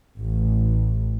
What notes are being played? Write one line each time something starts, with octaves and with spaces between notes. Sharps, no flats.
A1